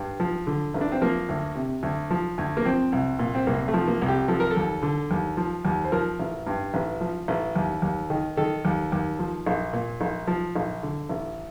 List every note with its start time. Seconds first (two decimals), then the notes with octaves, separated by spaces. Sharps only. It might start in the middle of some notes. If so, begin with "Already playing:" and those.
Already playing: G2
0.20 F3
0.47 D3
0.74 A1
0.81 D4
0.92 C4
1.02 F3 A#3
1.29 D2
1.55 C3
1.83 D2
2.11 F3
2.38 D2
2.57 A#3
2.65 F3 C4
2.92 C2
3.19 A#2
3.35 C4
3.47 C2 A#3
3.68 A3
3.74 F3
3.88 A#3
4.02 C2
4.08 G4
4.28 F3 A4
4.40 A#4
4.51 A4
4.56 D#2
4.82 D3
5.11 D#2
5.37 F3
5.65 D#2
5.84 C5
5.92 F3 A#4
6.20 A1
6.47 G2
6.74 A1
7.01 F3
7.28 A1
7.56 D#2
7.82 D#2
8.10 D#3
8.37 D#3 A4
8.65 D#2
8.92 D#2
9.19 F3
9.46 A#1
9.73 A#2
10.01 A#1
10.27 F3
10.56 A#1
10.83 D3
11.10 A1